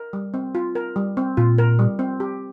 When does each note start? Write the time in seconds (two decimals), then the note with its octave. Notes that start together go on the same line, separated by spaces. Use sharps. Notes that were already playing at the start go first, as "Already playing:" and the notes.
Already playing: A#4
0.13 G3
0.34 C4
0.55 F4
0.75 A#4
0.96 G3
1.17 C4
1.37 A#2 F4
1.58 A#4
1.79 G3
1.99 C4
2.20 G4